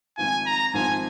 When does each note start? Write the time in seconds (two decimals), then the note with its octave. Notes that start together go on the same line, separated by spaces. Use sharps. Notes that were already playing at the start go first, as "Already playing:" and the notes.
0.17 G#1 G#2 F3 C4 F4 G#5
0.46 A#5
0.74 G#1 G#2 F3 C4 F4 G#5